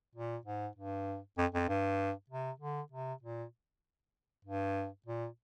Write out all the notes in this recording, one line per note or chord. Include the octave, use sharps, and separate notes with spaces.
A#2
G#2
G2
F2
F2
G2
C3
D3
C3
A#2
G2
A#2